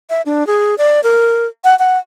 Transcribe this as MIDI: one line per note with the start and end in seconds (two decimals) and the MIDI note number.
0.10 0.22 76
0.26 0.46 62
0.47 0.75 68
0.78 1.00 74
1.03 1.47 70
1.64 1.77 78
1.79 1.98 78